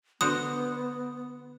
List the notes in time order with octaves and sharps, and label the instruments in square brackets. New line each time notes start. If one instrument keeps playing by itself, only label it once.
[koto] D3 F#4 C5 [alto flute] B3 [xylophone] D#6